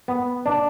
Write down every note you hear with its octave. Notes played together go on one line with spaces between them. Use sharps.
B3
D4